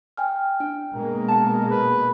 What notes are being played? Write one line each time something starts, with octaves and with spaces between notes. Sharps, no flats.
G5 G#5 F6
D4 G5
B2 G#3 A#3 A#4
F#5 A5
B4